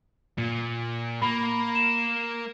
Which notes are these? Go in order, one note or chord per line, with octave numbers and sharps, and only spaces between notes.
A#2
A#3 B5
E7